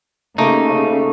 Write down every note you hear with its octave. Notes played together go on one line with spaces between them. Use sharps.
C#3 A3 A#3 D#4 G4